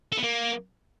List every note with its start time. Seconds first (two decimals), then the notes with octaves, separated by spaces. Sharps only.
0.12 A4
0.17 B3
0.23 A#3